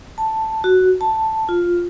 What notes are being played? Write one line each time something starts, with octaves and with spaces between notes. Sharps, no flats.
A5
F#4
A5
F4